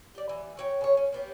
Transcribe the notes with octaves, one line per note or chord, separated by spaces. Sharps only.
G4 D5
E3
F#4 C#5 G5
C#3 C#5
C#4
A#3 B3 G4